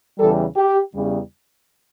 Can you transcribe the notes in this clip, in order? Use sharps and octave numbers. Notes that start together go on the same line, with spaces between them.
E2 C#3 E3 G3 A4
G4
E2 C#3 G3